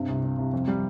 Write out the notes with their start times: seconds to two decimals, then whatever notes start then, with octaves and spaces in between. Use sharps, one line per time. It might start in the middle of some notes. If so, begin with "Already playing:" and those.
Already playing: G2 C3
0.08 C2
0.24 C3
0.38 C2
0.53 F2
0.68 G3